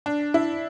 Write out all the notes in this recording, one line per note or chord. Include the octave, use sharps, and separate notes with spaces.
D4
E4